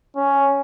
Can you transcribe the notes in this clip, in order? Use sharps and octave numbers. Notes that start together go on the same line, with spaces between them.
C#4